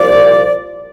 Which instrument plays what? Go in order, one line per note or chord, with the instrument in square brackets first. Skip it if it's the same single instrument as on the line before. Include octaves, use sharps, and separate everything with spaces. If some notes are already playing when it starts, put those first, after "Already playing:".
Already playing: [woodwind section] C2 A#2 F3 D5